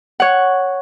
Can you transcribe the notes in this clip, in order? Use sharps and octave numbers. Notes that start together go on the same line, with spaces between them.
C#5 F#5